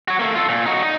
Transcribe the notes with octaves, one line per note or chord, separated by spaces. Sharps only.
F#4 C#5
A3 A#3
F4 A4
A#2
D#4 F#4
D#4